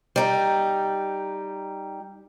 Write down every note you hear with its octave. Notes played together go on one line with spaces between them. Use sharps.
G3 D#4